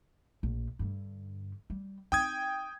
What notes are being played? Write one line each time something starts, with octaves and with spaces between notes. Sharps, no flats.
A#1
G2 D3
G3
C4 D#4 G5 D#6 G#6